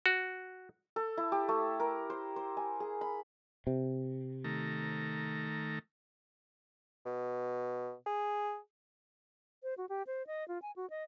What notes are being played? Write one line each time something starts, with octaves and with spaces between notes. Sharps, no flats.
F#4
A4
E4
G4
A3
A#4
C5
C5
G#5
G#4
B5
C3
D#3 A3 A#5
B2
G#4
C5
F#4
G4
C5
D#5
F4
G#5
F#4
D#5